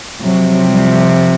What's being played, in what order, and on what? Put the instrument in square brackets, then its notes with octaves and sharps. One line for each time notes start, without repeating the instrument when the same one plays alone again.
[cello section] C3 F3 F#3
G3